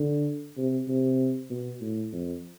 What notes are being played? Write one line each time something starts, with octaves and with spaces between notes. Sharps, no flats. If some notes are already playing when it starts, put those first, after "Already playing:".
Already playing: D3
C3
C3
B2
A2
F2